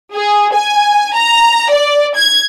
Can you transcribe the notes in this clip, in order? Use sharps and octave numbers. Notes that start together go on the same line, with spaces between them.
G#4
G#5
A#5
D5
G#6